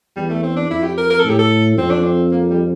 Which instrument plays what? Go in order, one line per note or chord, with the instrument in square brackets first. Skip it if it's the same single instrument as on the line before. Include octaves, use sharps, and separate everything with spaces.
[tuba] E2 [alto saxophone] G3
[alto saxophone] A3
C4
D4
[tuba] F2 [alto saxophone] E4
[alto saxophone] G4
A#4
A#4
A4
[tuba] A2
[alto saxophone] G4
A4
[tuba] F2 [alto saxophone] C4
[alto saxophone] D4
C4
A#3
G3